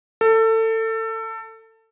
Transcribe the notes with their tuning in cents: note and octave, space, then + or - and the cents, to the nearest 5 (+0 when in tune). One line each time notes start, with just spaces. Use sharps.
A4 +25